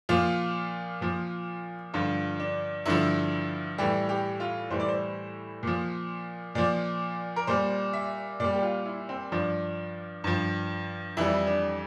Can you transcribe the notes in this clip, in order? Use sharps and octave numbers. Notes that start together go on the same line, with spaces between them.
A#2 F3 F4
A#2 F3
G2 D3 F3 F4
D4
G2 D3 F3 E4
A2 E3 G3 G4
G4
F4
A2 E3 G3 C5
D5
C5
A#2 F3
A#2 F3 D5
A#4
A#2 G3 C5
E5
A#2 G3 D5
G4
F4
E4
C4
G2 F3 D4
G2 F3
F2 E3 G3 E4
D4